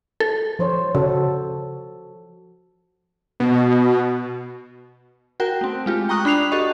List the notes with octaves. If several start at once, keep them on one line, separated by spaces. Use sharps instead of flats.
A4
F3 C5 C#5
C#3 F#4 A4
B2
F#4 A#4 G5
A3 C4
G#3 F4 G4
G5 A#5 C#6 D#6 F#6
D4 B5 F#6 C7 F7
F#4 G4 A4 D#5 C#6